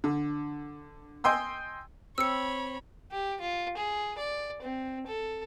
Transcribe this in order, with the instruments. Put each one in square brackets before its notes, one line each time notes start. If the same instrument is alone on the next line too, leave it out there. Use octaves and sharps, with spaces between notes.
[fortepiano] D3
D#5 G5 G#5 C6 E6
[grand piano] C4 [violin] C#5 B5 [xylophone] E6 C#7
[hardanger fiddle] G4
F4
G#4
D5
C4
A4